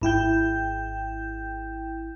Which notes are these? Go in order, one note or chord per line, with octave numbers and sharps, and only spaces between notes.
G#1 E4 G5 G6